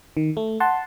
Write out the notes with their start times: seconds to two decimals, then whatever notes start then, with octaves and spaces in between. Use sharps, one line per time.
0.17 D#3
0.37 A3
0.60 F#5 A5 C6